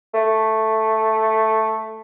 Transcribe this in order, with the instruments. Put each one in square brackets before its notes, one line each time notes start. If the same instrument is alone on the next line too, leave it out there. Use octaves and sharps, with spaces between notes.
[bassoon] A3